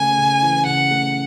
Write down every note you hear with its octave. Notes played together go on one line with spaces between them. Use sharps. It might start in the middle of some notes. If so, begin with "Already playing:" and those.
Already playing: C#3 A3 G#5
C#3
E3
C#3 F#5
A3